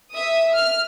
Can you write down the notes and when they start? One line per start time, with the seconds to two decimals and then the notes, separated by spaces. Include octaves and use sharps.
0.13 E5 D#6
0.53 F6